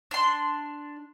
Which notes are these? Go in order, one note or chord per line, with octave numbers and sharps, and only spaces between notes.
D4 C6